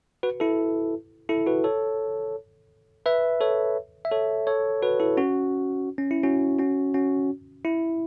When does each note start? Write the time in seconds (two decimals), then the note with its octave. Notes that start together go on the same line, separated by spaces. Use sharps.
0.23 F#4 B4
0.40 E4 A4
1.29 E4 A4
1.47 F#4 B4
1.64 A4 C#5
3.06 B4 E5
3.41 A4 C#5
4.05 E5
4.11 A4 C#5
4.47 A4 C#5
4.82 F#4 B4
5.00 E4 A4
5.17 C#4 F#4
5.98 C#4
6.11 E4
6.23 C#4 F#4
6.59 C#4 F#4
6.94 C#4 F#4
7.65 E4